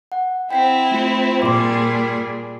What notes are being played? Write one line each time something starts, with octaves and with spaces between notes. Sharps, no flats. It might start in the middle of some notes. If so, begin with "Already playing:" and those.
F#5
C4 E4 G5 B6 C7
A3 F4 C#7
A#2 G3 G#4 C6 D6